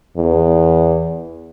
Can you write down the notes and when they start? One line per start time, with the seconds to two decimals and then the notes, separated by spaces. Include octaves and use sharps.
0.17 E2